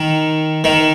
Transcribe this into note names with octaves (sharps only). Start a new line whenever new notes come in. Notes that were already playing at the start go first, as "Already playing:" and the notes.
Already playing: D#3
D#3